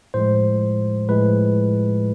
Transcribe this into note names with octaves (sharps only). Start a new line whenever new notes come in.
A2 F3 G#3 C5
A2 F3 G#3 B4